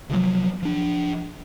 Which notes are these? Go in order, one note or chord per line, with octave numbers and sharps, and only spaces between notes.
C3 D#3 F3 F#3
F3 D4